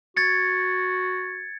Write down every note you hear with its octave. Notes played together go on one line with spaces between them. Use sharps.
F#4 G#6 A6 C#7